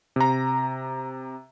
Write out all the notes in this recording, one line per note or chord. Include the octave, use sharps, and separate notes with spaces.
C3 A#5